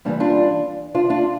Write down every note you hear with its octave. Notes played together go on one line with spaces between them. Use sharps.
G2 E3 G3 A#3 D4
D4 F4
D4 F4
D4 F4